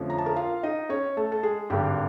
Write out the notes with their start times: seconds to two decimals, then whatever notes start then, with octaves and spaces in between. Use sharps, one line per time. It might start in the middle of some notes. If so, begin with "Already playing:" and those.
Already playing: F2 D3 F3 A3 C#4
0.10 A#5
0.18 A5
0.26 A#4 A#5
0.36 F4 F5
0.63 D#4 D#5
0.89 C#4 C#5
1.17 A3 A4
1.32 A4
1.43 G#3 G#4
1.70 G#1 G2 D3 G4